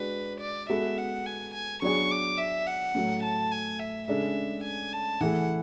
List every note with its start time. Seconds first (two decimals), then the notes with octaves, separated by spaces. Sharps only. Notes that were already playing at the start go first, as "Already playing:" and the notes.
Already playing: G#3 D4 F#4 B4
0.41 D5
0.69 G#3 B3 F#4 A4 E5
0.98 F#5
1.26 G#5
1.54 G#5
1.82 F#3 B3 D4 G#4 C#6
2.11 D6
2.38 E5
2.67 F#5
2.95 A2 F#3 A3
3.23 A5
3.51 G#5
3.80 E5
4.08 C#3 G#3 D4 A4 E5
4.64 G#5
4.93 A5
5.21 E3 A3 E4 G#4 F#5